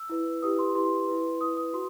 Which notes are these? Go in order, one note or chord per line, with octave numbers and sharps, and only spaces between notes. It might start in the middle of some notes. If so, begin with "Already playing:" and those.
Already playing: E6
E4 B4
E4 G4 B4 D#6
C6
E4 G4 B4 C6
E4 B4
E4 B4 D#6
D#6
F#4 C6